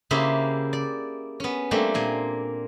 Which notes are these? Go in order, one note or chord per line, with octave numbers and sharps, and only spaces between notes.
C#3 A#3 E4 G4 C5 E5
D5
B3 C#4
G3 A3 A#3 C4 D4
A#2 A#3 G#5